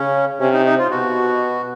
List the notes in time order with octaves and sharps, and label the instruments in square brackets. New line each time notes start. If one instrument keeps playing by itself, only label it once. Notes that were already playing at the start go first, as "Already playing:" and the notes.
Already playing: [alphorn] C#3 [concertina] C#4
[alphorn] C3 [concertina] C#4
[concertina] D#4
D#4
F4
[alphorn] B2 [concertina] F#4